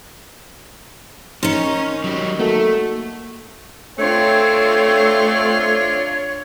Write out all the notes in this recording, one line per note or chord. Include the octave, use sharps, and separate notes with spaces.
D#3 C#4 D#4 C6
F#3 G4
A3 A#3 F#4 A4
A3 C4 D4 F4 C#5